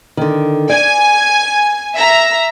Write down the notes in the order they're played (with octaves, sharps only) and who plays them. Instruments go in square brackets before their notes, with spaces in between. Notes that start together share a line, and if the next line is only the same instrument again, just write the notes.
[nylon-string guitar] D3 D#3
[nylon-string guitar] D5 [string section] G#5
[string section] E5 A#5